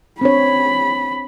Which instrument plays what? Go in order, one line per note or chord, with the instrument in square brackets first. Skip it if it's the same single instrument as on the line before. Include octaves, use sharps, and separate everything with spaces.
[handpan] C4 D4 C#5 [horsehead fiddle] B5